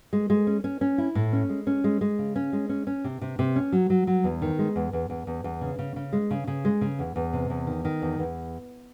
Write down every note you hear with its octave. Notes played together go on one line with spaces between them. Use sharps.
G#3
G#3
C#4
C#4
C#4
E4
A2
C#4
G#3
C#4
G#3
G#3
C#3
C#4
G#3
C#4
C#4
C3
C3
C3
C#4
F#3
F#3
F#3
E2
D#3
G#3
E2
E2
E2
E2
E2
C#3
C#3
C#3
G#3
C#3
C#3
G#3
C#3
E2
E2
C3
E2
D#3
D#3
E2
E2